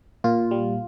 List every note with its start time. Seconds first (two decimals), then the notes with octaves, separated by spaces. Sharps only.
0.24 A#2 F4
0.51 G3